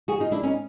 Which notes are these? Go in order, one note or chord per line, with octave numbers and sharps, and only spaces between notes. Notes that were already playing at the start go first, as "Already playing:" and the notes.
F#4 G#4
D#4 F4
D4 E4
C#4 D#4